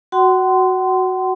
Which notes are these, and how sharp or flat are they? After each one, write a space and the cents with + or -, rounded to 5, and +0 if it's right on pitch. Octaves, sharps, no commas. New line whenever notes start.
F#4 +0 F#5 +35 C6 -20